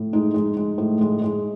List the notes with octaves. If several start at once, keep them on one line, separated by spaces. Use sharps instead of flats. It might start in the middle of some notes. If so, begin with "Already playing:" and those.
Already playing: A2
G#3 D#4
G#3
G#3
A2
G#3
G#3